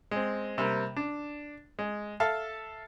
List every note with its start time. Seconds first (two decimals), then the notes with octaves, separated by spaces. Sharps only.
0.11 G#3 C4
0.58 C3 G3 A#3
0.96 D4
1.79 G#3
2.20 A4 E5 F5 A5